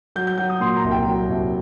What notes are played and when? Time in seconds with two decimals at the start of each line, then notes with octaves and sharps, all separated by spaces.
0.16 F#3 G6
0.27 G6
0.38 F#3 G6
0.50 D#6
0.60 A#2 C6
0.77 A#5
0.84 C2
0.91 G5
1.06 F#3
1.30 C2